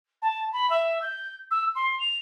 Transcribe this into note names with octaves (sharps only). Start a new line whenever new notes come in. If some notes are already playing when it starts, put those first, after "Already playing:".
A5
B5
E5
G6
E6
C6
F7